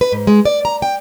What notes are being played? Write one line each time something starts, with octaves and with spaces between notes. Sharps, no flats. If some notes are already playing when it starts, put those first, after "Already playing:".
B4
G#2
G#3
D5
A#5
G5